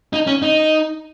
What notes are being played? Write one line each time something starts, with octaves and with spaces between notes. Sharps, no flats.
D#4
C#4
D#4